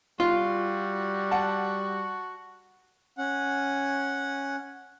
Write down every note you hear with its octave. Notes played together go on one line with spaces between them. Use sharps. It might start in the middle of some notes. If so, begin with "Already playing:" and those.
G3 F4 F#4
F#5 A5
C#4 F#5